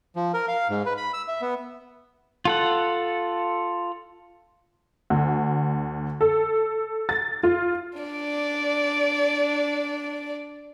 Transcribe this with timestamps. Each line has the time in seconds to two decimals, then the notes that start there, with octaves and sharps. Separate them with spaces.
0.16 F3
0.34 A#4
0.48 F5
0.69 G#2
0.86 B4
0.97 B5
1.13 E6
1.28 E5
1.41 B3
2.45 F4 A4 F#5
5.10 D2
6.21 A4
7.09 A6
7.43 F4
7.99 D4 D5